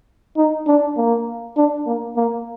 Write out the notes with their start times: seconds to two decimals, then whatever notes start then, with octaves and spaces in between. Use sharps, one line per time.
0.37 D#4
0.67 D4
0.97 A#3
1.57 D4
1.87 A#3
2.17 A#3